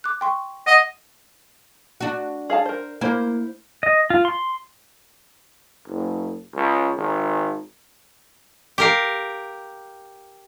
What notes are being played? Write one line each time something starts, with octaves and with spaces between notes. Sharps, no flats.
D6 F#6
G5 C6 C#6
D#5 F#5 D#6
D4 F#4
G#4 F5 A5
A#4 C5
A#3 E4 C5
D#5
F4
C6
F#1
C#2
G#1
G4 A#4 F5